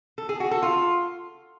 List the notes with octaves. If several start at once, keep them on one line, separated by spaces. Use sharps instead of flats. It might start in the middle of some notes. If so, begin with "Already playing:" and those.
A4
G#4
F#4
A4
F4